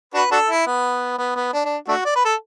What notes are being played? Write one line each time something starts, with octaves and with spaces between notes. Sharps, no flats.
D4 F#4 B4
D4 F#4 A4
E4
B3
B3
B3
D4
D4
A3 D4 F#4
D5
B4
A4